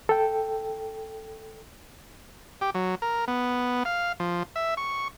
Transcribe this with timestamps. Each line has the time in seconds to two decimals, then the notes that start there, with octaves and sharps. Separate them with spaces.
0.09 A4 G5
2.61 G4
2.75 F#3
3.02 A#4
3.28 B3
3.85 F5
4.20 F3
4.56 E5
4.77 C#6